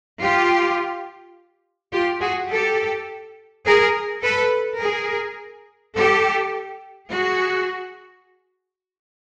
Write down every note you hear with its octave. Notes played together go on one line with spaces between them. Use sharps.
F4 G4
F4 G4
F#4 G#4
G4 A4
G#4 A#4
A4 B4
G#4 A#4
G4 A4
F#4 G#4